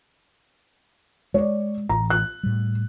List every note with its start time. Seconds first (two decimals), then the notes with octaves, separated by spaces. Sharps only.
1.34 G#3 C#5 D5
1.89 A1 A#5
2.10 F#6
2.43 A2 G3